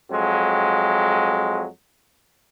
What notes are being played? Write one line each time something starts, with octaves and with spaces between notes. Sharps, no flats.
F2 F#3 G#3